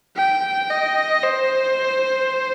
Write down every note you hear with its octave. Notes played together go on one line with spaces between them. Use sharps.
G5
D#5
C5